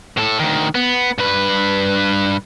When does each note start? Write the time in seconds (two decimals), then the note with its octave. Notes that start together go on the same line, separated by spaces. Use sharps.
0.17 A2 A4
0.40 D2 D#3
0.75 B3
1.18 G2 B4